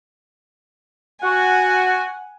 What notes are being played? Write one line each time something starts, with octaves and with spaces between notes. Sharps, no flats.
F#4 F#5 G#5